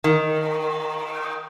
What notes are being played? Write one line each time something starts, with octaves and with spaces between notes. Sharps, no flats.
D#3